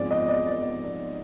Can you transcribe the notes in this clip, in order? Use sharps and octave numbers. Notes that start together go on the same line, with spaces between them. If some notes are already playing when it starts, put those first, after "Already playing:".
Already playing: G#2 F3 G#3 C4 D5
D#5
D5
D5